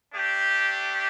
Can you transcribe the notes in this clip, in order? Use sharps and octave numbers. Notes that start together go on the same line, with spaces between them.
A3 D4 G4